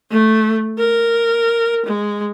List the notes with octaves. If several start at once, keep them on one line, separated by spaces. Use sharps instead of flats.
A3
A#4
G#3